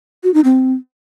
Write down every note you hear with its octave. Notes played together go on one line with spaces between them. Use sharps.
F#4
D#4
C4